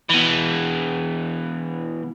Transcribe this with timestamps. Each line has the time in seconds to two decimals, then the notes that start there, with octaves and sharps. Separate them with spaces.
0.09 B2 E3